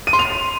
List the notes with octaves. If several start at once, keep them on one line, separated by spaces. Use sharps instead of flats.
D#7
C6
F7